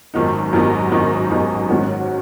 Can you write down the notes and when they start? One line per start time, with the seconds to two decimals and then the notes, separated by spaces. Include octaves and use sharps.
0.14 G#1 F#2 D#3 B3 D#4
0.53 G#1 F#2 D#3 B3 D#4
0.91 G#1 F#2 D#3 B3 D#4
1.30 G#1 F#2 D#3 B3 D#4
1.69 G#2 D#3 F#3 C#4 F#4